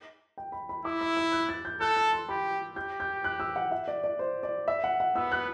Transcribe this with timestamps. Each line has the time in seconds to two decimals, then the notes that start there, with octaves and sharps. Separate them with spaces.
0.38 G5
0.52 B5
0.69 B5
0.85 E4 D6
1.01 E6
1.17 E6
1.32 F#6
1.49 A6
1.65 G6
1.81 A4 F#6
1.96 E6
2.13 C6
2.29 G4 B5
2.76 G4 G6
3.00 G6
3.24 F#6
3.40 E6
3.56 F#5
3.71 E5
3.88 D5
4.04 D5
4.19 C5
4.43 D5
4.68 E5
4.84 F#5
5.00 F#5
5.16 B3 E6
5.32 F#6